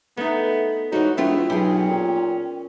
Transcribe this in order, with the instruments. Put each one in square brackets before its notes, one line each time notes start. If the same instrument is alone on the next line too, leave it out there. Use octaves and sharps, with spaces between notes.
[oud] A3 D#4 [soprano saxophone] B3
[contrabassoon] G#2 [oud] E3 F#4 [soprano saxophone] D#4 [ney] C#5
[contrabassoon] E1 [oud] A3 B3 F4 [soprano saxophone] E4 [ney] G5
[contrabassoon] B1 [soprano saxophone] C#4 [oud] G4 G#4
[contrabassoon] A#2